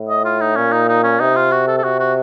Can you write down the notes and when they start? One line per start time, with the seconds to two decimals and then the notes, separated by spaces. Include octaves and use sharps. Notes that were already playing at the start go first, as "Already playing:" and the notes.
Already playing: A2
0.09 D#5
0.25 F4
0.41 D#4
0.57 A#2 C#4
0.73 D#4
0.89 D#4
1.04 C#4
1.20 C3 D#4
1.36 F4
1.52 F#4
1.68 A4
1.78 A4
1.84 C3 F#4
2.00 F#4